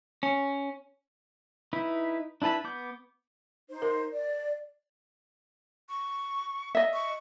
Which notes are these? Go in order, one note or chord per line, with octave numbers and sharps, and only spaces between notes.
C#4
D#4 E4 B4
D4 E4 B4 A5 B5
B3 D6 G6
D#4 C5
A#4
D5
C#6
D#5 E5
C#6